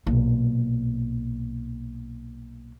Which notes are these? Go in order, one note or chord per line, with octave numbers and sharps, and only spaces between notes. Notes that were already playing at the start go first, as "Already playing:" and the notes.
B1 A#2